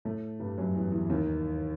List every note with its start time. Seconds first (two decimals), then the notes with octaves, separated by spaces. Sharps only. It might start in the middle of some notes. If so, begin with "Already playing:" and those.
0.05 A2 A3
0.40 G2 G3
0.57 F#2 F#3
0.75 E2 E3
0.92 E2 E3
1.10 D#2 D#3